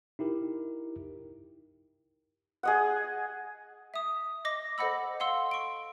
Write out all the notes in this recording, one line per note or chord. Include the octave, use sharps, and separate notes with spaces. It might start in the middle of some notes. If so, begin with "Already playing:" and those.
D#4 E4 G4 A#4
G#4 D#5 F#5
E5 D#6
D#5 D6 A#6
A4 C5 D#5 F#5 B5 E6
F5 F#5 C6 E6
C#6 D7